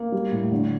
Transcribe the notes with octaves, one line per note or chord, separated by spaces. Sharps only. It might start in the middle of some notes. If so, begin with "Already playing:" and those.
Already playing: A#3
G3
A2
D3